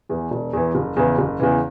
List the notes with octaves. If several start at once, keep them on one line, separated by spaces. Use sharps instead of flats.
E2 E3
E1
E2 E3
F#1
E2 C#3 E3
F#1
E2 C#3 E3